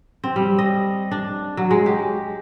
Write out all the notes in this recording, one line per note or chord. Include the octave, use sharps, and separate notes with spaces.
C4
G3
D#5
D4
F#3
G#3
G4